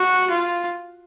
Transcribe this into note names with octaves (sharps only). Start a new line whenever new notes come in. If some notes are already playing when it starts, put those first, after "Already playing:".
Already playing: F#4
F4